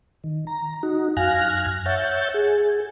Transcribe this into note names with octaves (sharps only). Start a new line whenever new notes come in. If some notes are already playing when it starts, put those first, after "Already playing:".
D#3
A#5
D#4 F#4
F#2 F5 G#5 F6 F#6 A#6
C#5 E5 F#5 G6 A6
G#4